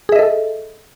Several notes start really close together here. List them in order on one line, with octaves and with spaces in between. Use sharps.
G#4 E5 D#5 A4